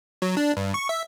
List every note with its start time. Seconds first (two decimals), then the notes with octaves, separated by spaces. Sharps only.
0.22 F#3
0.37 D4
0.57 G2
0.74 C#6
0.89 E5